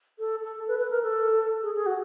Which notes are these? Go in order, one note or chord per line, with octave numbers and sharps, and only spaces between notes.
A4
A4
B4
B4
A#4
A4
G#4
G#4
F#4